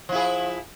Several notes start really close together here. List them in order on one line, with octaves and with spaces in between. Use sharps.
F3 E4 G#4